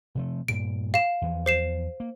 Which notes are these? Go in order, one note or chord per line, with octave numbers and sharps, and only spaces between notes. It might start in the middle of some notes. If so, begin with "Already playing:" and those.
C3 F3 A3
G2 A#2 D7
F5 E7
E2 E3 F3
C5 C7 E7
A#3